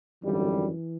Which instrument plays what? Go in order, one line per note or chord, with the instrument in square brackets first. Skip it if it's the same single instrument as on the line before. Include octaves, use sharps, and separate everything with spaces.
[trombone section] G#1 F#2 D3 G3 [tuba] E3